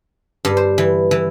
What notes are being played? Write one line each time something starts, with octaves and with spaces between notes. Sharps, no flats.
G2
C5
E3
E3